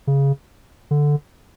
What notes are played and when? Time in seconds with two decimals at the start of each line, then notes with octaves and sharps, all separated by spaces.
0.07 C#3
0.91 D3